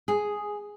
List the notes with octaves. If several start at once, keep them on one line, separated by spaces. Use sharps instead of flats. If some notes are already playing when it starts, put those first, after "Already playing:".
G#4